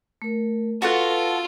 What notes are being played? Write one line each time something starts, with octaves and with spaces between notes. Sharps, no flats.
A3 A#4
F4 F#4 A4 B4 F#5